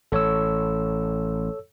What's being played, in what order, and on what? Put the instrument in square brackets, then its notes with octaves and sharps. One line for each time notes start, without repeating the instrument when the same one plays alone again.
[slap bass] A1 [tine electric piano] A4 C#5 E6